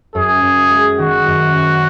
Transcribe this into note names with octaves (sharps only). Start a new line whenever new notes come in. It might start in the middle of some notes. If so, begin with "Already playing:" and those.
F#2 G#4
F#2
G#3
D#3 F#4
F#2
F#2